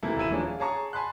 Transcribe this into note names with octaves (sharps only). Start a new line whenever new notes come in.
C3 E3 A#3 E4 A4
D#1 C4 E4 D#7 E7
E3 F3 G#3 A#3 C#4 D4
F5
G#4 C#5 A5 A#5 C#6
G#5 A5 B5 C6 F#6